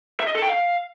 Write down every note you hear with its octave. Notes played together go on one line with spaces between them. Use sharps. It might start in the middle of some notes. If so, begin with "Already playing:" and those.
E5
D#5
A4
G5
F5